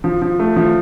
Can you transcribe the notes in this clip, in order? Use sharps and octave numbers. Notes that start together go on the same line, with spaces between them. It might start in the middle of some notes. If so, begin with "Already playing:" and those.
F3
F3
A3
F3